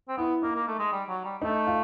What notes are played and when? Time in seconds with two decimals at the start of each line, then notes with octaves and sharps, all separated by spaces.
0.08 C4
0.17 B3 E4
0.42 A#3 D#4
0.55 A#3
0.67 A3
0.79 G#3
0.92 G3
1.09 F#3
1.25 G3
1.42 A3 D#4
1.67 F4